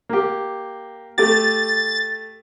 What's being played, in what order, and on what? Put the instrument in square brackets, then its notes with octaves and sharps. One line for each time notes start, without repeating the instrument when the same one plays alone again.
[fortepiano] A#3 G4
[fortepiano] A3 G4 [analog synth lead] A6